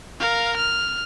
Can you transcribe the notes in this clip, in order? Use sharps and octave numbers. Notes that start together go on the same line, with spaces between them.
A#4 F5
F6